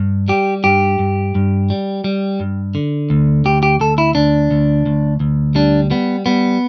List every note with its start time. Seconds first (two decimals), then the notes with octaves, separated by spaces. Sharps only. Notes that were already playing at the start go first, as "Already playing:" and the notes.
Already playing: G2
0.28 G3 G4
0.64 G2 G4
0.99 G2
1.35 G2
1.70 G3
2.04 G3
2.40 G2
2.75 D3
3.10 D2
3.45 D2 G4
3.63 G4
3.80 D2 A4
3.98 E4
4.15 D2 D4
4.51 D2
4.86 D2
5.20 D2
5.55 G3 D4
5.90 G3 B3
6.26 G3 B3